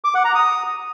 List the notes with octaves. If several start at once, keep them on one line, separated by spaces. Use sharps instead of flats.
D6
F#5
A#5
D#6